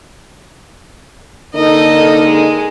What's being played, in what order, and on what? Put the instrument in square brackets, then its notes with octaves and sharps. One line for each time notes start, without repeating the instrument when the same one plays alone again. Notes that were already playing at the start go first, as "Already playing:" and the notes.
[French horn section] D3 A#3 D#4 [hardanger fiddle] A4 D#5 [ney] A#4
[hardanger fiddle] G#3